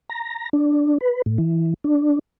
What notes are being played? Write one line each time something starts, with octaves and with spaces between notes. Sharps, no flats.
A#5
D4
B4
A2
E3
D4